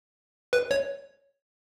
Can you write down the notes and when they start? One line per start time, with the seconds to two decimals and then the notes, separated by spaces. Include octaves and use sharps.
0.53 B4
0.71 C#5